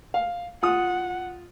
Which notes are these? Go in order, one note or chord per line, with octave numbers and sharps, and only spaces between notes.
F5
F4 F#5 D#6